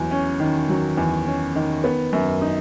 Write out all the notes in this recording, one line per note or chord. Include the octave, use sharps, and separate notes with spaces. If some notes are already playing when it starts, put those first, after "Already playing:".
Already playing: E2 F#3
C#4
D#3
F#3
E2
C#4
D#3
B3
F#2
D#4